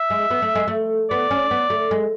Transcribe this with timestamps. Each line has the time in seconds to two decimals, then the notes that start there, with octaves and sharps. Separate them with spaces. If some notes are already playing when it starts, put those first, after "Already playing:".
Already playing: E5
0.10 G#3
0.30 B3
0.42 A3
0.55 G#3
0.68 A3
1.10 B3 D5
1.31 C#4
1.51 B3
1.70 A3
1.91 G#3